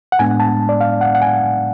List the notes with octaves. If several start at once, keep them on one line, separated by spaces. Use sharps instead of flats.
F#5
A2 G#3 B3 D4 G#5
A5
D5
F5
F#5
F#5
G#5